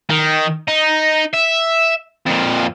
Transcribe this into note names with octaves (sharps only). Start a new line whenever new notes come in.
D#3
D#4
E5
F2 A#2